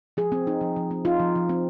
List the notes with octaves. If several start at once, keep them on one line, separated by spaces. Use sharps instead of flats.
F3 G#4
C4
D#4
F3
F3
C4
D#4 F4
F3
F3
C4